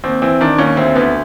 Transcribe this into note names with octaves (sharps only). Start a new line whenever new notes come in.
D#2 C4
E3 C4
D#3 D4
D#2 C#4
D2 C4
D2 B3